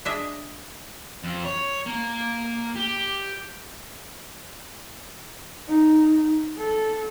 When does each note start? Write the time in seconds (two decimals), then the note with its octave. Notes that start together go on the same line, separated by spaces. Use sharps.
0.05 D4 G#4 D#5 E5
1.24 F2
1.45 C#5
1.86 A#3
2.76 G4
5.68 D#4
6.58 A4